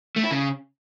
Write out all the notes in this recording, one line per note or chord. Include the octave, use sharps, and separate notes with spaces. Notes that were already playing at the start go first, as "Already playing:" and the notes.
A3
E4
C#3